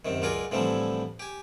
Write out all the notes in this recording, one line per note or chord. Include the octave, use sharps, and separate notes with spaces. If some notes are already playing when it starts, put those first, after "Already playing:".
F#2 C3 D#3
C#2 F#3 F4 A#4 D5 G#5
A2 D3 E3 F3 G3 C4
G4 G#5